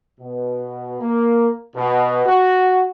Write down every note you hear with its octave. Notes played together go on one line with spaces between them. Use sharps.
B2
A#3
B2
F#4